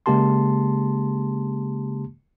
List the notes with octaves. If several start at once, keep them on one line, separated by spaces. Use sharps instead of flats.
C#3 G#3 A#3 G4 A5 C6